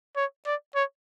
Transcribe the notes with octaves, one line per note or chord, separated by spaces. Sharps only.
C#5
D5
C#5